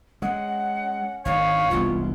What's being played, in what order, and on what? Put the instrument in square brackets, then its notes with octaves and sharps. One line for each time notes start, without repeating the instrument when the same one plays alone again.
[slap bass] G#3 [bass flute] C#4 [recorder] F#5
[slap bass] G#1 D#3 [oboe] C#5 [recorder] F5
[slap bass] E1 C2 B3 [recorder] F4